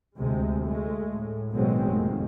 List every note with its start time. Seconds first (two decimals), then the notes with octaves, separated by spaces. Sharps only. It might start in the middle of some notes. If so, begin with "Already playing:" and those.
0.16 D2 C3 G#3
0.63 G#3 A3
1.13 A2
1.52 B2 D#3 F#3 G#3 A#3 C4
1.88 F1 D#3 A#3